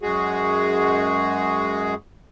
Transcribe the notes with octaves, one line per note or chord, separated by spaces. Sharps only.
F#2 G#3 F#4 G#4